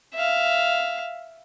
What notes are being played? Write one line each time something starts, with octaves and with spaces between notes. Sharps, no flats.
E5 F5